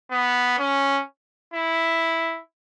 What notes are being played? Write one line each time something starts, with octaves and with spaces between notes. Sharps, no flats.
B3
C#4
E4